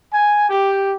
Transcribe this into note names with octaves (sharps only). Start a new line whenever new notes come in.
G#5
G4